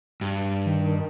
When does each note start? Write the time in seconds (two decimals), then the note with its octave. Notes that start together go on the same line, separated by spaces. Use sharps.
0.21 G2
0.66 D#3